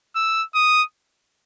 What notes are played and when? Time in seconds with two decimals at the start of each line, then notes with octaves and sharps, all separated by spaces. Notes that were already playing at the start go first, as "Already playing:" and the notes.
0.16 E6
0.55 D#6